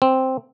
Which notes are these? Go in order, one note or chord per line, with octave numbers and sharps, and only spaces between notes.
C4